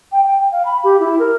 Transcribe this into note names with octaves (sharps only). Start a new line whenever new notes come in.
G5
G5
F5
B5
G4
E4
A#4